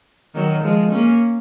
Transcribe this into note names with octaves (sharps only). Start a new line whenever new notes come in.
D#3 F#3
F3 G#3
A#3 C#4